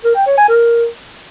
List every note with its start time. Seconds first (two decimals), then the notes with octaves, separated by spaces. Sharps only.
0.04 A#4
0.15 G5
0.26 C#5
0.37 G#5
0.48 A#4